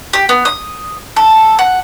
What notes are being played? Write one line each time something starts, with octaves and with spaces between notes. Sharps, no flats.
G4
B3
D#6
A4
F#5